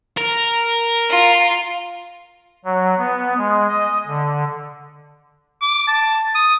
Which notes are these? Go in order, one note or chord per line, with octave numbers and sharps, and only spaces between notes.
A#4
F4
F#3
B3
G#3
D#5
D3
D6
A5
D#6